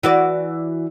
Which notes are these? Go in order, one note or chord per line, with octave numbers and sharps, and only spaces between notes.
E3 F#4 D5